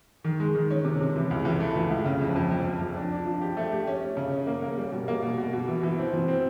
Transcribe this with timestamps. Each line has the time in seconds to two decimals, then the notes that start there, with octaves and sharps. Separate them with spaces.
0.24 D#3
0.40 G#3
0.55 D#3
0.70 C#4
0.85 C3
1.00 C3
1.16 E3
1.31 C#2
1.45 E3
1.60 A3
1.76 E3
1.90 C#2
2.06 C#3
2.21 F2
2.36 F2
2.51 F2
2.66 F2
2.81 F2
2.96 D4
3.12 D4
3.26 F3
3.41 G4
3.57 A3
3.71 G4
3.87 C#4
4.02 C#4
4.17 C#3
4.32 C#4
4.46 A#3
4.62 A#3
4.77 G3
4.92 B2
5.08 A#3
5.23 B2
5.38 B2
5.53 B2
5.68 E3
5.83 E3
5.98 C4
6.13 E3
6.28 C4